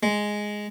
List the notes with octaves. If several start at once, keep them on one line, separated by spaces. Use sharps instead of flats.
G#3